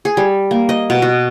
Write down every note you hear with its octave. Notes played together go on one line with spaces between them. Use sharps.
G#4
G3
A#3
D#5
B2
F#4